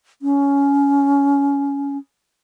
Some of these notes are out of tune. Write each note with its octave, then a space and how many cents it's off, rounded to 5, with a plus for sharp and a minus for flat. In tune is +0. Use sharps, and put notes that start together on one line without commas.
C#4 +20